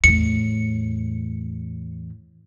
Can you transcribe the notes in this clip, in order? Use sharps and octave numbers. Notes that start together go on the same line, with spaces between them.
E2 A2 C#7